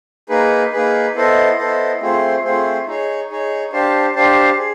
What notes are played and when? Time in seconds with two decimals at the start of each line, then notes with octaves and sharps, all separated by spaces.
0.29 A#3 D#4 G#4 B4
0.73 A#3 D#4 G#4 B4
1.15 B3 E4 A4 C5 D#5
1.57 B3 E4 A4 C5 D#5
2.00 A3 C4 F4 G#4 C5
2.44 A3 C4 F4 G#4 C5
2.86 D#4 G#4 C#5
3.30 D#4 G#4 C#5
3.72 D4 G4 C5 F5 A5
4.15 D4 G4 C5 F5 A5
4.58 G#4